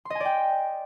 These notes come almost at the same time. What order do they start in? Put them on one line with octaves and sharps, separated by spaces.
C6 D#5 G#5 D5 G5